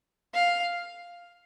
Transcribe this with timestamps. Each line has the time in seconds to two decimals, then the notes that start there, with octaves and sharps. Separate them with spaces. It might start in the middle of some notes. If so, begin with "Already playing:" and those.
0.34 F5